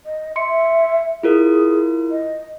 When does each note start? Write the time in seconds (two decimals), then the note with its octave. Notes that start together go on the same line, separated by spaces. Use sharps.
0.06 D#5
0.36 E5 C6 C#7
1.23 E4 F4 G#4 A#4
2.11 D#5